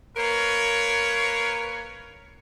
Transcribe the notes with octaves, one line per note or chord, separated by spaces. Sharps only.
A#3 A#4 B4 C#5